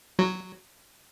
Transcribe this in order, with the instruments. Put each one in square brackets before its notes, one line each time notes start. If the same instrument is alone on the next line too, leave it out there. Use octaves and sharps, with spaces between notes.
[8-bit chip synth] F#3